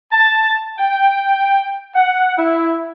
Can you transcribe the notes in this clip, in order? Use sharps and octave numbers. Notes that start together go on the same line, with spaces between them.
A5
G5
F#5
E4